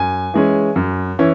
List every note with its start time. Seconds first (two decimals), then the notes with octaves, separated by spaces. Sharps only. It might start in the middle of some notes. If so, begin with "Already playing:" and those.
Already playing: F#2 G#5
0.34 E3 G#3 C#4
0.76 F#2
1.19 E3 C#4